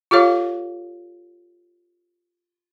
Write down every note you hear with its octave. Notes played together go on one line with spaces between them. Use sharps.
F4 G4 A4 C#5 F5